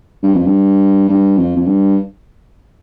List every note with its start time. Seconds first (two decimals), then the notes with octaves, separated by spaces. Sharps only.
0.23 G2
0.34 F2
0.46 G2
1.09 G2
1.38 F2
1.56 F2
1.66 G2